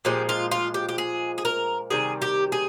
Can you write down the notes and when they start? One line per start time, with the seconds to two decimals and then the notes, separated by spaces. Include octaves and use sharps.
0.05 A#2 F3 G#3 G4
0.29 F4
0.51 F4
0.74 G4
0.89 G4
0.98 G#4
1.38 G#4
1.45 A#4
1.90 C3 D#3 G3 G#4
2.22 G4
2.52 G#4